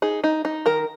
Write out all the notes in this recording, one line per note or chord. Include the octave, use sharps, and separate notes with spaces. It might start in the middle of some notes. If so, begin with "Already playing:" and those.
D#4 G#4
D#4
D#4
D#3 A#4